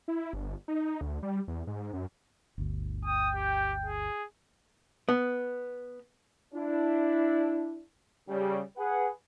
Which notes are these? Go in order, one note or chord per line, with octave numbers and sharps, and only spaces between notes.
E4
G1
D#4
D2
G3
E2
G#2
F#2
G1 D2
G5 D#6
G4
G#4
B3
D4 E4
C#3 G3
G#4 B4 F#5 G#5